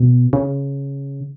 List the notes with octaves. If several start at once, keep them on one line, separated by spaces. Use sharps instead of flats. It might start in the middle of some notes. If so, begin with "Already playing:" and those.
Already playing: B2
C#3